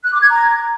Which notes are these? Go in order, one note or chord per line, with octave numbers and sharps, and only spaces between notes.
F#6
D6
G#6
A#5